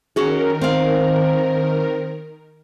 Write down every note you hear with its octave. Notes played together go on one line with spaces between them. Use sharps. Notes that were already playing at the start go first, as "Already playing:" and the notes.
D#3 C#4 F#4 G#4 A#4
C4 F5